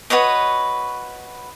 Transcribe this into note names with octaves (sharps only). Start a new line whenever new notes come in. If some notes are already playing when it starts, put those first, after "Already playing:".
F#4 B4 C#5 D#5